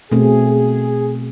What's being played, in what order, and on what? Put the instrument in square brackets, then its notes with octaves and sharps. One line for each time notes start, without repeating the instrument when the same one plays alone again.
[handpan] B2 A3 C4 [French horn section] G#4